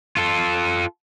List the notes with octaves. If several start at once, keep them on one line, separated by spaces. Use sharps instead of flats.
F4 A4